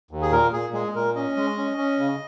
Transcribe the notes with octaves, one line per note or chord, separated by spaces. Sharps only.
D#2
G#4
A#2 A#4
A#2 G#4
G#3 G#4
A#2 A#4
C#4 D#5
G#3
C#4
C#4
C#3